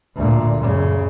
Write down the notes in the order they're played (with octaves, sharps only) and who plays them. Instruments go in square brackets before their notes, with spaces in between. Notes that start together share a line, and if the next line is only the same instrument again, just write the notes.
[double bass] D2 A#2
F#2 C#3